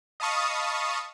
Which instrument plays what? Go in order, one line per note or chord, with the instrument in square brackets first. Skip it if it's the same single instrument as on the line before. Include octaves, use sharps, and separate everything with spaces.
[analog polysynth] D#5 F5 A5 B5 C#6 D#6